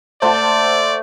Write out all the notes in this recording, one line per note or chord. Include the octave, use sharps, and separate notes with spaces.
A3 C5 D5 F#5 C6